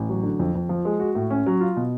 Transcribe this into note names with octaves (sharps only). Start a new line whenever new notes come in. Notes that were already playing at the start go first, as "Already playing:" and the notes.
Already playing: A1
F#3
D3
F2
F2
F3
G#3
F#4
A2
C#4
F#3
F4
B2